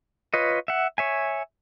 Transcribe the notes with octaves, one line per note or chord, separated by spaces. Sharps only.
F4 B4 C#5 D#5
E5 F#5
C#5 E5 G#5